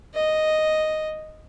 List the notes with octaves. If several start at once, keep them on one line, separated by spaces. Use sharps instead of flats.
D#5